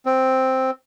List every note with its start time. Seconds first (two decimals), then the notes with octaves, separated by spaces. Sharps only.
0.06 C4